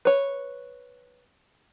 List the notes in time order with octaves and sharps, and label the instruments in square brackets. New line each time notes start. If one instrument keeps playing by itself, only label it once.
[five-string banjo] B4 C#5